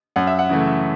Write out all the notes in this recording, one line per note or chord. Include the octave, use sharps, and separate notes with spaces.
F#2 F#5
E5
F#5
C#3 E3 A3